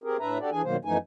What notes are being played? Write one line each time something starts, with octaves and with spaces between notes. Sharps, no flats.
C4 G4 G#4 A#4
A2 D4 B4 E5 A#5
D4 F#4 G4 A4 D5
E3 D4 G#4 G#5
F2 B2 D#3 F#3 A#3 C5
F#2 E3 F3 A3 D#4 G#5